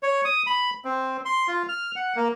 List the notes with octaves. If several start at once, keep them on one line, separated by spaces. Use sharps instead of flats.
C#5
D#6
B5
C4
C6
F4
F6
F#5
A#3